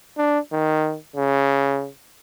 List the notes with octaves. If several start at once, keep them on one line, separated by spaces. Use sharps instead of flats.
D4
D#3
C#3